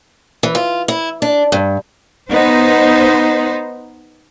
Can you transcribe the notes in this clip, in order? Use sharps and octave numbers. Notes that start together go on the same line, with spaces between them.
E3
F4
E4
D4
G2
B3 D#4 C5